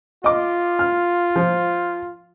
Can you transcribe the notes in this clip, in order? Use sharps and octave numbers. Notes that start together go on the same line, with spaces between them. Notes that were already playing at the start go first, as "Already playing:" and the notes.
F4 D#5 D6
F6
F3